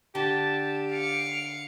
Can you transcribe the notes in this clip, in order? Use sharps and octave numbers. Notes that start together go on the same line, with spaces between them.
D3 G4 A5
F5 C#7 D7